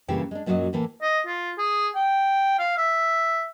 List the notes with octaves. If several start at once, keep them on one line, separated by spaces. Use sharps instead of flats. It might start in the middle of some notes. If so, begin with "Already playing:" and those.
G2 A#2 C#3 E3 G4 G5
G#3 D4
F#2 A#2 F#3 F4 F#4 D#5
A2 E3 A#3 A4
D#5
F4
G#4
G5
F5
E5